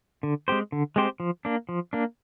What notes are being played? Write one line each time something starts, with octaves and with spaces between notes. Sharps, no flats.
D3
G#3 C4 G4 C5
D3
G#3 C4 G4 C5
F3
A#3 D4
F3
A#3 D4